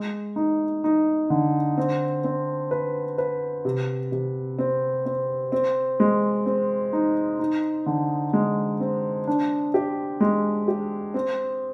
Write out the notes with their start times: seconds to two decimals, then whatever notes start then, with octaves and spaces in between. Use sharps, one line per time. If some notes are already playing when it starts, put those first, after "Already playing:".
Already playing: G#3
0.36 D#4
0.84 D#4
1.30 D3
1.77 C4
2.24 C4
2.71 B4
3.18 B4
3.65 C3
4.12 C3
4.59 C4
5.06 C4
5.52 C4
6.00 G#3
6.46 C4
6.93 D#4
7.39 D#4
7.86 D3
8.33 G#3
8.80 C4
9.27 D4
9.74 G4
10.20 G#3
10.68 G4
11.14 C4